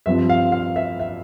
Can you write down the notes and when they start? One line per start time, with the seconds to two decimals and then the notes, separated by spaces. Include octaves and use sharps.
0.06 G2 F3 C4 E5
0.29 F5
0.52 F5
0.76 E5
1.00 E5